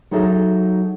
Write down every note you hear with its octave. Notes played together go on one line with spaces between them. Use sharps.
F#3 D#4 G#4 A4 E5